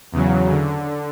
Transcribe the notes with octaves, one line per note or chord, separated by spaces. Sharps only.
E2 C#3 F#3
D3